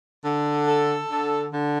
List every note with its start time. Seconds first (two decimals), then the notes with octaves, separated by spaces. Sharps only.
0.24 D3
0.68 A4
1.10 D3
1.53 D3